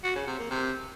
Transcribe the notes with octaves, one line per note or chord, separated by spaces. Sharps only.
F#4
C#3
C3
A#3
C3